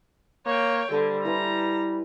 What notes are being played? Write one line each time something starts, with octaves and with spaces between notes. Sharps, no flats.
A#3 C#5 G5
D3 G3 A4 C5
E4 B4 G#5 A#5